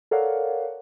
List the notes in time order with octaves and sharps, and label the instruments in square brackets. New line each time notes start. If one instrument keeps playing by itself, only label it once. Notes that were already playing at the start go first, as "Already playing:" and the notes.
[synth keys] A4 A#4 C#5 D5 F5 F#5